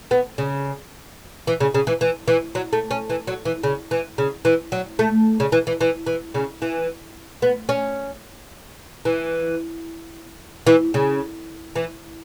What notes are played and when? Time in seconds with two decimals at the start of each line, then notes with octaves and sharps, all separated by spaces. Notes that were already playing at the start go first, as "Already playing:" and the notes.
0.11 B3
0.38 C#3
1.47 E3
1.60 C#3
1.74 C#3
1.87 E3
2.01 E3
2.28 E3
2.55 F#3
2.73 A3
2.91 C#4
3.10 E3
3.27 F#3
3.45 E3
3.63 C#3
3.91 E3
4.18 C#3
4.45 E3
4.72 F#3
4.99 A3
5.40 C#3
5.52 E3
5.67 E3
5.81 E3
6.06 E3
6.34 C#3
6.62 E3
7.42 B3
7.69 C#4
9.05 E3
10.67 E3
10.94 C#3
11.76 E3